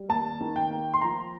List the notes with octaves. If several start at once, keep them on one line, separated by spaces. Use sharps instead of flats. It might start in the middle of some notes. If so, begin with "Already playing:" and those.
Already playing: G3
D#2 A5
D#3
G5
A#3
C6
F3 A#5